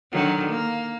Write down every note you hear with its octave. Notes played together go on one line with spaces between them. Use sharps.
D3 D#3 F#3
A#3